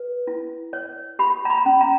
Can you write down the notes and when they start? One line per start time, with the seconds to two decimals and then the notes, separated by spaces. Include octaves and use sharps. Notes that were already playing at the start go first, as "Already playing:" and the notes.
Already playing: B4
0.27 E4
0.73 C#5
1.19 G4 B5
1.45 A#5
1.50 B5
1.66 C#4
1.81 A#5